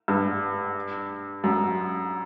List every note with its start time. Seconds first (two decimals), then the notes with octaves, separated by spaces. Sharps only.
0.08 G2
1.44 F#2